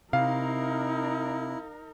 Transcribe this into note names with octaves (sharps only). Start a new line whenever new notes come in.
C3 D#4 E4 A#4 F5